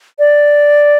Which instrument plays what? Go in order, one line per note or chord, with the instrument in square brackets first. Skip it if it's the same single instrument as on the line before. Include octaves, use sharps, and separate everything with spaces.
[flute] D5